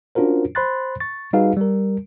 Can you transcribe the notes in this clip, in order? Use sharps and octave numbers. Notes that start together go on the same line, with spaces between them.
C#4 D4 F4 F#4 A#4 C5
C5 B5 C6 F#6 A6
C#6 A6
G3 D#4 F#4 G#4 B4 F5
G3 A#4